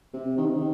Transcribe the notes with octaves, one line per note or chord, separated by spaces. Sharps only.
C3
D#3
C3
D#3